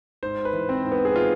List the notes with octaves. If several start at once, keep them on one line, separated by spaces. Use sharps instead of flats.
G#2 C5
B4
E3
C4
G#2
B3
G#4
E3 F4